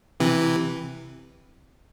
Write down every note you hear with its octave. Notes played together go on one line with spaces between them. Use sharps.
C3 E3